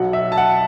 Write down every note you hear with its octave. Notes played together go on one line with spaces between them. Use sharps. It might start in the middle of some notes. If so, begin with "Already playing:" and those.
Already playing: B1 B2 F#3 F#5
E5
A5
F#5